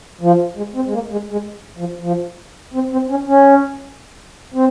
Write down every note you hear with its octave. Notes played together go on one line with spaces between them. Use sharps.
F3
G#3
C4
G#3
A#3
G#3
G#3
F3
F3
C4
C4
C#4
C#4
C4